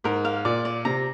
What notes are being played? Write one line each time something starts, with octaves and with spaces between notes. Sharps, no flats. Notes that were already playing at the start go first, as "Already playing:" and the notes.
G#2 A#4
F5
A#2 D5
D5
C3 A#5